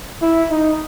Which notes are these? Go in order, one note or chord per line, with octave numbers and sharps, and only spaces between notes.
E4
D#4